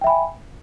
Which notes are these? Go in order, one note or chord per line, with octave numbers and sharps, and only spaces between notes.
E5 G5 G#5 B5